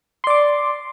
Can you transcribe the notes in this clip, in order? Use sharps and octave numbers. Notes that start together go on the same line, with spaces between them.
D5 C6 D6